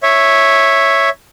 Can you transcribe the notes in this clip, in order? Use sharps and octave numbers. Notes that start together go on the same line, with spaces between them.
C#5 E5